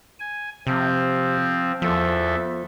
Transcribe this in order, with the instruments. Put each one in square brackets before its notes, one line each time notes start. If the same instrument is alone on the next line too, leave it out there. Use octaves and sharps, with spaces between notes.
[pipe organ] G#5
[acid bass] C3 [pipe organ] F3 C4
[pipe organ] E2 A4 E5 [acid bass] F3